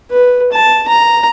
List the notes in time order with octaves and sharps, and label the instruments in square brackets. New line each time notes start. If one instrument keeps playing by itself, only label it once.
[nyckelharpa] B4
A5
A#5